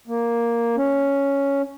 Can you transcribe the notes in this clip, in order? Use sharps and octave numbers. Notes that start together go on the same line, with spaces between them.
A#3
C#4